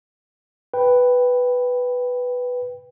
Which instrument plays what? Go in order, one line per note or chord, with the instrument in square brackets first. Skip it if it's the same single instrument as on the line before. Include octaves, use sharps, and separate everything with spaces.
[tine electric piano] B4 G5